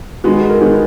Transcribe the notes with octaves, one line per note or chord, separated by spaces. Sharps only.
D#3 G#3 B3 F#4
G#4
A#4
D#3 G#3 B3 G#4